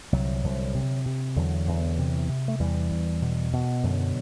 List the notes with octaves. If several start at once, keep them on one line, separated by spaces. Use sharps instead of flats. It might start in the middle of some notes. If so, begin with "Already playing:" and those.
C2 D3 F#3
C2
C3
C3
E2 D3 F#3
E2
C3
C3
A3
E2 E3 G3
E2
B2
B2
F#2 D3 F#3